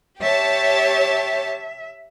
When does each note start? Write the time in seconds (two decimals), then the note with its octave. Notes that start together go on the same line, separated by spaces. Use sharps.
0.21 G4 C#5 E5 A5